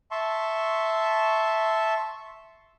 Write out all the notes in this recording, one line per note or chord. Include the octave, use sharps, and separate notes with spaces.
E5 A5 C6 C#6